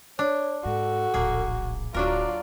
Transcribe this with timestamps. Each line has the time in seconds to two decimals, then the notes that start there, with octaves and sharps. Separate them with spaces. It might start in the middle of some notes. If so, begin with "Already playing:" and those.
0.19 D4 C#5
0.65 G#2 F#4 A4
1.14 D1 A#1 A#3 G#4
1.94 D1 F#3 D4 F4 F#4 A#4 D5